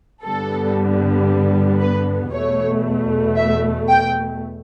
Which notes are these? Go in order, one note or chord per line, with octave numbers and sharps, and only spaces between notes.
G2 D3 G3 B3 A4
B4
E2 B2 A3 C#5
E5
G5